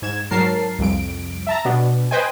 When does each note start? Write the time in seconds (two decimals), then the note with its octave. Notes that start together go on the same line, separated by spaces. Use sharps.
0.02 G#2 G#6 E7
0.31 G#2 F#3 A#4 A5 C7
0.79 C2 F2 D7
1.47 E5 A5 A#5
1.65 B2 B3 D4
2.11 B4 C5 D#5 G5 G#5